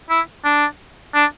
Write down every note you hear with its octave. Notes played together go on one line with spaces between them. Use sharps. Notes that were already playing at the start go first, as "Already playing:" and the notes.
E4
D4
D4